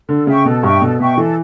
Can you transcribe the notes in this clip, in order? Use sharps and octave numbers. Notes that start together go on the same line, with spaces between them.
D3 A4
C#3 E5 G5 C#6
B2 A4
G2 E5 G5 C#6
B2 A4
B2 E5 G5 C#6
E3 A4